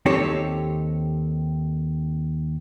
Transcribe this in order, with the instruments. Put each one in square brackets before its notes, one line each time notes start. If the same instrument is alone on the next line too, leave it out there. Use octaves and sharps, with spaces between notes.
[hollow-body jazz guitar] D#2 C4 D#4 G4 A4 C#5